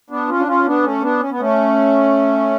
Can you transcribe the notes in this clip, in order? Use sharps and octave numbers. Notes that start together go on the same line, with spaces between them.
B3 D4
C#4 F4
D4
C#4 F4
B3 D4
A3 C#4
B3 D4
C#4
B3
A3 C#4